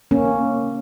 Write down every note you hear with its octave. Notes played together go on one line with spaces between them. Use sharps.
A#3 C#4